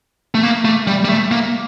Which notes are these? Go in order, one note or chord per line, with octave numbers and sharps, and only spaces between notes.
A3
A#3
A3
G3
G3
A3
A#3